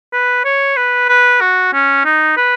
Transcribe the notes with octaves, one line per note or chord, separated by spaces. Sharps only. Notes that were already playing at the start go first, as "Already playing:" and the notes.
B4
C#5
B4
B4
F#4
C#4
D#4
B4